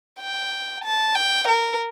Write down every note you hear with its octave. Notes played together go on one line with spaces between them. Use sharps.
G5
A5
G5
A#4